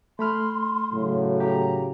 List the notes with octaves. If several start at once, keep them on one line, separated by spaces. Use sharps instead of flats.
A3 B5 C6 F6
A2 C#3 F#3
G4 A#5